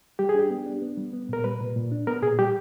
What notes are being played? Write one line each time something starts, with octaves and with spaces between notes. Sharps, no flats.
G3 G4
G#4
D4 G4
B3
D4
B3
G3
B3
A#2 A#4
G3 B4
A#2
A#2
D4
B3 A#4
A#2 G#4
G3 G4